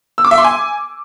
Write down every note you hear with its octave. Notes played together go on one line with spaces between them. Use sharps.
E6
D6
E5
C6
G#5